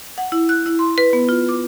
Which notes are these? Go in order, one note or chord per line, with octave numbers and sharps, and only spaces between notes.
F#5
E4
F#6
E4
C6
B4
B3
F4
D6